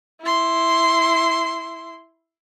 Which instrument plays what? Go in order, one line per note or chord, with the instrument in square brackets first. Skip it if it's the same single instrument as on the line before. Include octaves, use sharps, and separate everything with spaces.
[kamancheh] E4 C6